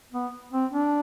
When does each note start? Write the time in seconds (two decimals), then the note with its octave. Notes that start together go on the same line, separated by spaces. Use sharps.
0.13 B3
0.53 C4
0.72 D4